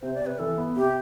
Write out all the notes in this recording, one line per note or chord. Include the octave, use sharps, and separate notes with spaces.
C3 C5
D5
C3 B4
E3 A4
B3
C3 G4